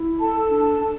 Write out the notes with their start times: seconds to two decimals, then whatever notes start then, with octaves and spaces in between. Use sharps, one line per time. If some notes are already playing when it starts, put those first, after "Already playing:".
Already playing: E4
0.19 A4 A5
0.50 D4
0.82 D4